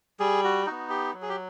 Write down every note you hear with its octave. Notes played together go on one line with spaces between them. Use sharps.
G3 G#4
F#4
B3 D#4 F#4
G4
F#3
G#4
G4